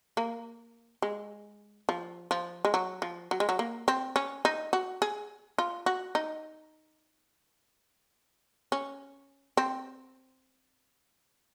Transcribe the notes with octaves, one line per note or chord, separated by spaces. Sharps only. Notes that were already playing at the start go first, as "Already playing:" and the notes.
A#3
G#3
F3
F3
G#3
F#3
F3
F#3
G#3
F#3
A#3
C4
C#4
D#4
F#4
G#4
F4
F#4
D#4
C#4
C4